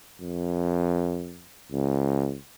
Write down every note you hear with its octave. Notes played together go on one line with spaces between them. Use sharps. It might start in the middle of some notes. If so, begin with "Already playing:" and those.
F2
C#2